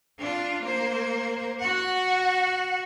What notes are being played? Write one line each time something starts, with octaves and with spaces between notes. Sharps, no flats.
D4 F4
A#3 C5
F#4 F#5